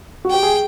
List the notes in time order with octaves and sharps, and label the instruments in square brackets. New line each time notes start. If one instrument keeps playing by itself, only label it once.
[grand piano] F#4
[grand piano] G4 [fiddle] G5
[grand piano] G#4